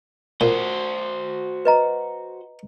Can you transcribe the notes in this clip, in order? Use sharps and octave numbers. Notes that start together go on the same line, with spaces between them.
A#2 F#4 C5
B4 D#5 A#5